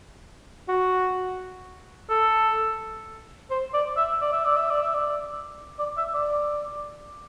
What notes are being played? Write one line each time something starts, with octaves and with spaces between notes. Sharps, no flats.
F#4
A4
C5
D5
E5
D5
E5
D5
E5
D5
E5
D5
D5
E5
D5